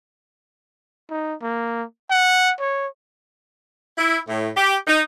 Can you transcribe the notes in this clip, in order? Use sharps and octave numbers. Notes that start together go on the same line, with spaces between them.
D#4
A#3
F#5
C#5
E4
A2
G4
D#4